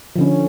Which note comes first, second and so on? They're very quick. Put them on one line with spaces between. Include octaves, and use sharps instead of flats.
F3 D3 C#4